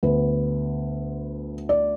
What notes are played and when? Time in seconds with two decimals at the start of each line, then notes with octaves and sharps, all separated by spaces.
0.03 D2 D3 B3 B4
1.69 D5